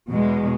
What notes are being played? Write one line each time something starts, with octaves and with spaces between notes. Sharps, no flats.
E2 B2 G#3